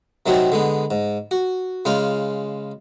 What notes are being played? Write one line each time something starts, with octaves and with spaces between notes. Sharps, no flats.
C3 D#3 F#3 C4 D#4 F#4
D3 G#3 B3
G#2
F#4
C#3 G#3 F4 F5